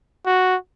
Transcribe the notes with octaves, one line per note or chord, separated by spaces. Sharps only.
F#4